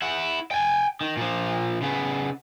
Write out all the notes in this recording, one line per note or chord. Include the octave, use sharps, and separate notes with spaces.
E4 F#5
G5 G#5
D#3
A#2 F3
C#3 B3